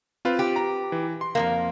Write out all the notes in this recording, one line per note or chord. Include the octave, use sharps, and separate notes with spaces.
C4 F4 B4
G4
A#5
E3
C6
F2 G#2 A#3